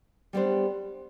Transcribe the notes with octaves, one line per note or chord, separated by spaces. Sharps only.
G3 B3 D4 G4 C5